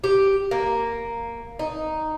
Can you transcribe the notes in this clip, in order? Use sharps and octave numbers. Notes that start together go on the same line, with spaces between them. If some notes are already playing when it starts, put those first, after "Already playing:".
G4
A#3
D#4